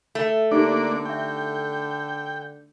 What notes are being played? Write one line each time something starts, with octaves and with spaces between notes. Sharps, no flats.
A3
D3 A#3 D4 D#4 G4 D5 C#6
E5 G5 C#6